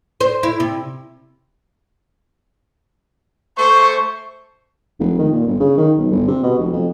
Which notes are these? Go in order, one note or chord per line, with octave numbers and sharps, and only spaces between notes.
C5
E4
C3
A3 C5 C#6
F1
D#3
A#2
G1
C#3
D#3
B1
G1
C3
B2
F1
F2